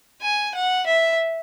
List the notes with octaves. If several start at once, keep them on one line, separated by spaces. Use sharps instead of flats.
G#5
F#5
E5